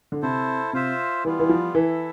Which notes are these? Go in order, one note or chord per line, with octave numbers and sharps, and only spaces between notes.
D3
C3 E4 A4 C5
C3 F4 C5 E5
E3 G3 B3 F4
E3
F3
E3 E4 A4 E5